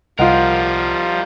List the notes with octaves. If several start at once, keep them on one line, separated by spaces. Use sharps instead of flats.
C2 F3 G3 F4 A#4 D#5 F#5